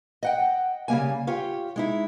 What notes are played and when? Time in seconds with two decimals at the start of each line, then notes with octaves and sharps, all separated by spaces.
0.23 D#5 F#5 G5
0.88 C#3 G3 A#3 G#5
1.27 F4 G4 C#5
1.76 G#3 D#4 E4